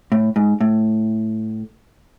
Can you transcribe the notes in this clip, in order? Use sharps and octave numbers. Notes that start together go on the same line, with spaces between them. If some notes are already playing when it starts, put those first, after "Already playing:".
A2
G#2
A2